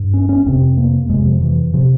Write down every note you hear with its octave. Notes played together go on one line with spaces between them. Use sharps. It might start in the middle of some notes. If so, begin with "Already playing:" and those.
Already playing: G2
C#4
C#4
F2 C3 C4
A#3
F2 C3 G#3
F3
E3
C3 F3